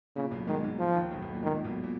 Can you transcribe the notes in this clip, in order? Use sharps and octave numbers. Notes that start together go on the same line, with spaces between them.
A#2 C#3
B1 B2
G#2 D#3 G#3
G#2 G#3
F3
D#2 D#3
B1 B2
B1 B2
A#2
G#2 D#3
A#2
B1 B2
A#2